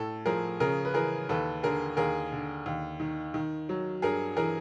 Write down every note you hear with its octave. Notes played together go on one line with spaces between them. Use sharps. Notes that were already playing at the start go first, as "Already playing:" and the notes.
Already playing: A2 A4
F3 G#4 A#4
C#3 G#4 A#4
B4
E3 G#4 A#4
D#2 A4 B4
D3 G#4 A#4
D#2 G#4 A#4
D3
D#2
D#3
D#3
F#3
G2 G#4 A#4
E3 G#4 A#4